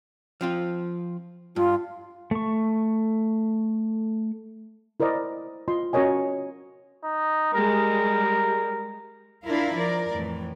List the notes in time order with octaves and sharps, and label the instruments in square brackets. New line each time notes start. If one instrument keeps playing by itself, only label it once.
[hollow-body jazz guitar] F3 C4 F4
[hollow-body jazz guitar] G2 [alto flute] F4
[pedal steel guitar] A3 C#6
[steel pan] E4 A#4 C5 D5 D#5
F4 D#5 C6
C#4 F#4 A#4 C#5 D#5 G#5
[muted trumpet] D#4
[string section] G3 G#3 [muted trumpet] A#4
[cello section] D4 E4 F4 A#4 F5
F3 A#4 D5
F2 A2 E3